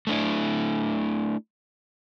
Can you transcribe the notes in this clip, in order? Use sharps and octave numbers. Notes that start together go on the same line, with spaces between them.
A3 D4 E4